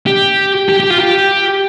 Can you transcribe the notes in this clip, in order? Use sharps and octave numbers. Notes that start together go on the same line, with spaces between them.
G4
G4
G4
F4
G4